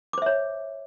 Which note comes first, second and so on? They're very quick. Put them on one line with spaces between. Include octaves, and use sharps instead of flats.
D6 C5 E5 C#5